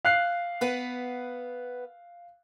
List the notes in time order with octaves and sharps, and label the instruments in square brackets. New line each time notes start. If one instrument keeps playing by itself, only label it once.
[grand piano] F5 F#6 C7
[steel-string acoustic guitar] B3 B4 F#5